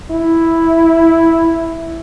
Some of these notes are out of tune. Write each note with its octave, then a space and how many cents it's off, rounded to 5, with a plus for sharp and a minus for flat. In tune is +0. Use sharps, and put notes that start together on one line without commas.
E4 +0